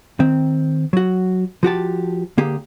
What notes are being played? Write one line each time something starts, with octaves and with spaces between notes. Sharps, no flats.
D#3 C4
F#3 F#4
F3 F#4 G4 A5
D3 A#3 G4 G#4